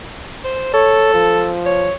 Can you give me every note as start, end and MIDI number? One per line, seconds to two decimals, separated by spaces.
0.44 0.70 72
0.73 1.52 69
0.73 1.09 73
1.13 1.91 53
1.66 1.93 73